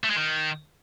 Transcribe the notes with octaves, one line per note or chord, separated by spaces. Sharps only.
A3
G#3
D#3